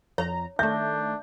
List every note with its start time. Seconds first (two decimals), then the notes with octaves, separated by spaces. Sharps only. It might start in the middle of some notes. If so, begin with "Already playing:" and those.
0.18 F2 C#5 A#5
0.59 D#3 A3 D4 E5 G6